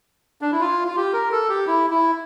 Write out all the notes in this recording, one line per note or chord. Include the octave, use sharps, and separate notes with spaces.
D4
E4
F4
F4
G4
A#4
A4
G4
E4
E4